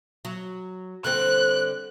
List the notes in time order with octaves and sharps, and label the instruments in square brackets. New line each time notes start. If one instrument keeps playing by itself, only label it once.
[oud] F#3
[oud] D3 G3 C4 [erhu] F#6